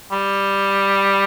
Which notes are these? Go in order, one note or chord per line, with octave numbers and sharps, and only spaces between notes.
G3